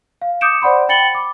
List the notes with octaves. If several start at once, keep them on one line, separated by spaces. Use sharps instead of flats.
F5
D6 D#6 G6 C#7 D7 E7
C5 D5 F#5 B5 C6
G5 B5 A6 C#7 F#7 G7
D6